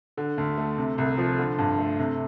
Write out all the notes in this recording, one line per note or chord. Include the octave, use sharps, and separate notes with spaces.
D3
D2
A3
C3
C2
F3
D3
G2
A3
C3